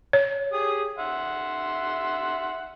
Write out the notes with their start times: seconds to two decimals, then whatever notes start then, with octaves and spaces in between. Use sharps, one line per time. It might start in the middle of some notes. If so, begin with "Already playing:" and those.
0.13 C#5
0.53 G4 G#4 D#6
0.99 E5 F#5 C6